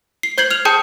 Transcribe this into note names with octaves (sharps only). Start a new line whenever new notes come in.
C7
C5 G6 G#6 C7 F#7
F6 F7
G#4 G5 A5 D#6 G6 C#7